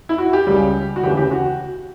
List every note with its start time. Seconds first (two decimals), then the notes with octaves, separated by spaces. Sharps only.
0.09 E4
0.18 F#4
0.33 G4
0.47 C#2 C#3 G3
0.96 F#4
1.03 E1 D2 C#3 E3 G4
1.17 G4
1.31 F#4